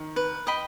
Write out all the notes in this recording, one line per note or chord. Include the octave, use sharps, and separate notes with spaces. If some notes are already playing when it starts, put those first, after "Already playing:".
Already playing: D#3
B4
D#5 G5 B5